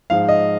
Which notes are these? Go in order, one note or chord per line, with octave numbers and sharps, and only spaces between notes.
G#2 F3 G#3 F5
D#5